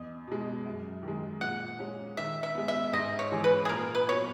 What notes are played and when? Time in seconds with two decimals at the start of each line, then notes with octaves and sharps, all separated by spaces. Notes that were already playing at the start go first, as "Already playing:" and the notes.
Already playing: E2 D#5
0.27 B2 G#3
0.66 F#2
1.03 D#3
1.08 G#3
1.41 A#2 F#5
1.79 G#3 C#4
2.17 D#3 E5
2.43 E5
2.55 G#3 B3
2.68 E5
2.93 G#2 D#5
3.19 C#5
3.32 E3 G#3 C#4 G#4
3.44 B4
3.65 G#4
3.69 A#2 A#4
3.95 B4
4.08 F#3 B3 C#5